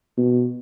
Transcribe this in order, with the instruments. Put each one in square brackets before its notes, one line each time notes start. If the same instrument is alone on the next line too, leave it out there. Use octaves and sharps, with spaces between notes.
[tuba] B2